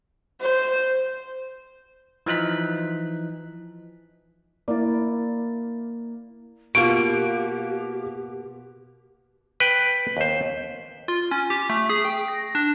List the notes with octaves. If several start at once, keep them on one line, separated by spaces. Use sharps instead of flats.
C5
E3 F3 D#4 F#6 B6
A#3 E4 D5
B2 A#3 F4 G4 C#6 D7
B4 G5
D#2 C5
F4
C#4
G4
A3
G#4
G5
A#6
D4